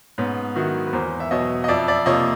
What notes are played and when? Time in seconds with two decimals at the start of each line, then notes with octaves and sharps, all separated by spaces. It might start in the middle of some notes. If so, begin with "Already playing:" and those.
0.18 G#2 B3 C#4
0.55 D#3 F#3 E4 F#4
0.87 B4
0.93 E2 A#4 C5
1.20 E5
1.31 B2 F#3 C#5 D#5
1.64 D#5
1.68 F2 D5 E5
1.88 D5 E5
2.06 C3 F3 A#3 C#5 D#5